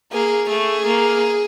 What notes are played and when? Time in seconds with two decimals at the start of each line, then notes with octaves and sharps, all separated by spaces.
0.12 A#3 G#4
0.49 A3 G#4
0.86 A#3